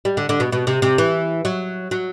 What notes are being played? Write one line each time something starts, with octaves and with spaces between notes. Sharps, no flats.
G3
D3
D3
B2
B2
C3
C3
E3
F#3
F#3